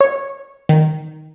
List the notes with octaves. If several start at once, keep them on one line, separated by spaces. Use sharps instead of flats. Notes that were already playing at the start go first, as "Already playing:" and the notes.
C#5
D#3